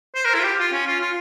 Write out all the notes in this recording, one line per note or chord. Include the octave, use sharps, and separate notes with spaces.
C5
A#4
E4
F4
G4
F4
C#4
F4
F4